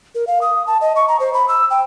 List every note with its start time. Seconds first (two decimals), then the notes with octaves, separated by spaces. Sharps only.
0.15 A#4
0.27 F5
0.42 D#6
0.67 A5
0.81 D#5
0.96 C#6
1.08 A#5
1.20 C5
1.34 B5
1.48 E6
1.71 G5